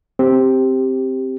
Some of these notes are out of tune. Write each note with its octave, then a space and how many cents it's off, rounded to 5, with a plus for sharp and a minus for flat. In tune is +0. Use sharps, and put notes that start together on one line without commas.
C4 +0 G4 +0